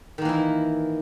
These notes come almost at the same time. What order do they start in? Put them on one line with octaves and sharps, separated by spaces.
D#3 A#3 E3 E4